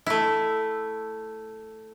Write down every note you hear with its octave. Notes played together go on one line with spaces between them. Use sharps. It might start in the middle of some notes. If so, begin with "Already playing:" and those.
A3 E4